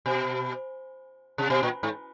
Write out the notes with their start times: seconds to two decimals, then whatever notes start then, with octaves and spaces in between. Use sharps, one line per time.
0.06 B2
1.38 C3
1.50 B2
1.63 A#2
1.83 G#2